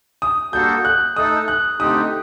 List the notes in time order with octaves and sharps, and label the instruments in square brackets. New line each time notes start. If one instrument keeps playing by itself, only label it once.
[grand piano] D#6
[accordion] G3 A#3 D4 F#4 A4 [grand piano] G6
[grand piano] F#6
[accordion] A3 D#4 A4 [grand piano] D#6
[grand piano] F#6
[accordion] D3 A3 C4 D#4 G4 [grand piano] D#6